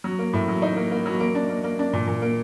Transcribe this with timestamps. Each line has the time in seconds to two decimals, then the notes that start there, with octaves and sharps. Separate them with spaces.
0.04 F#3
0.19 A#3
0.33 A2
0.48 F#3
0.62 D#4
0.76 A#3
0.91 A#3
1.06 F#3
1.20 A#3
1.35 D4
1.50 A#3
1.64 A#3
1.79 D4
1.93 A#2
2.07 A#2
2.22 A#3